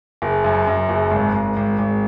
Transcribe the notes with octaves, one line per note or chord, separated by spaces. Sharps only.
F#1
F#2
F#2
F#1
G#1
G#1
G#1
G#1